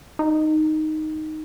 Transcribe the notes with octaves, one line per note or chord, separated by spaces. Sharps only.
D#4